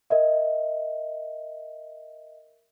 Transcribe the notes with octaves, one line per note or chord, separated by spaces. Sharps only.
A#4 D#5 E5